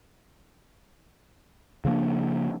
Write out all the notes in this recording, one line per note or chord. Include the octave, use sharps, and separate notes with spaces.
C#3 F3 A#3 D4